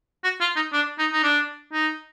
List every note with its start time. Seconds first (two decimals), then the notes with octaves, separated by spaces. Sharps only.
0.24 F#4
0.41 F4
0.56 D#4
0.73 D4
0.98 D#4
1.12 D#4
1.23 D4
1.73 D#4